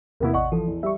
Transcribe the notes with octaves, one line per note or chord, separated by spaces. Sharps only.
E2 C3 A#3 B3 E4
A1 D5 D#5 F#5 C#6
E3 F3 A4
E2
G3 E5 C#6